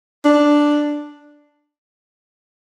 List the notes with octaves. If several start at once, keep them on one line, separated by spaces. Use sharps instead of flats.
D4